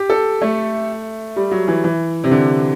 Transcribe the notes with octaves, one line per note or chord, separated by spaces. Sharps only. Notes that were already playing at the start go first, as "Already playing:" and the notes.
Already playing: G4
A4
A3
G3
F#3
E3
E3
C3
D3